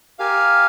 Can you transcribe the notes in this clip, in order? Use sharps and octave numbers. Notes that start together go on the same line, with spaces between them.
G4 A#4 F5 G#5